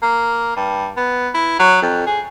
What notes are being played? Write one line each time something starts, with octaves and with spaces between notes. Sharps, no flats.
A#3
G2
B3
E4
F#3
F2
G#4